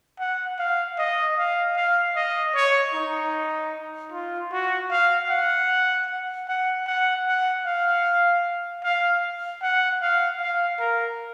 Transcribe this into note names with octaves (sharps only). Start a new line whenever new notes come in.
F#5
F5
D#5
F5
F5
D#5
C#5
D#4
F4
F#4
F5
F#5
F#5
F#5
F#5
F5
F5
F#5
F5
F5
A#4